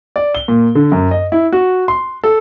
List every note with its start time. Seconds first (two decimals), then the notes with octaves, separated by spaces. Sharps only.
0.16 D5
0.35 G7
0.48 A#2
0.75 D3
0.92 F#2
1.11 D#5
1.32 E4
1.53 F#4
1.88 C6
2.24 A4